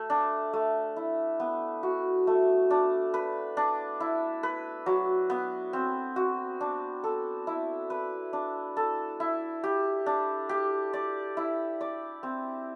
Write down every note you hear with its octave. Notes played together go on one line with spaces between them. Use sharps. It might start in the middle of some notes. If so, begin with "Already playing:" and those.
Already playing: A3
D4
A3
E4
B3
F#4
A3
D4
B4
D4
E4
B4
F#3
B3
C4
F#4
D4
A4
E4
B4
D4
A4
E4
G4
D4
G4
D5
E4
D5
C4